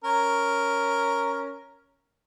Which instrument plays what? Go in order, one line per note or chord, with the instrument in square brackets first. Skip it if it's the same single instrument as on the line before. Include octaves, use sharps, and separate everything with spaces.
[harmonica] C#4 A#4